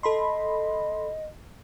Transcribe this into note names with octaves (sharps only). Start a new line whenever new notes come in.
A4 D#5 B5 C6